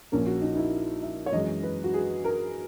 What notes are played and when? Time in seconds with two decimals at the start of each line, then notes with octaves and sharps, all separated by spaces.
0.12 A#1 A#2 A#3 C#4 A#4
0.26 F#4
0.42 D#4
0.53 D#4
0.57 E4
1.03 E5
1.26 C#5
1.32 F#2 E3 G#3 D#5
1.63 B4
1.84 F#4
1.94 G#4
2.24 A#4